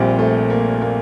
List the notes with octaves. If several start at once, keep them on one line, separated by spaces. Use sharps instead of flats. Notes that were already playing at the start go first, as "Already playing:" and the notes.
Already playing: A#1 A#2 G3 C4
A3
A#3
A#3